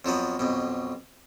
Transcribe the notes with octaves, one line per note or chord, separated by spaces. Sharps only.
F2 F3 F#3 B3
B1 F2 B2